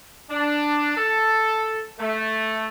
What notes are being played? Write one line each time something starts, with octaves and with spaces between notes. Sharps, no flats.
D4
A4
A3